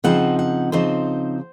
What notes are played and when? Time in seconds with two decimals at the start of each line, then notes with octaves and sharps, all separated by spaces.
0.04 C#3 F3 C4 D#4 F#5
0.39 F#5
0.72 C#3 F3 C4 D#4 C5